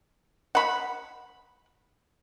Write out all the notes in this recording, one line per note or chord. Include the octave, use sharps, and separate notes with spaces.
F#5 B5